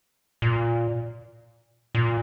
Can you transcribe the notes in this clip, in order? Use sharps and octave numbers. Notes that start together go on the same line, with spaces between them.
A#2
A#2